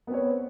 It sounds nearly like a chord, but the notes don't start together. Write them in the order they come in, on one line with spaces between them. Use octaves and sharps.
B3 C4 C#5 B4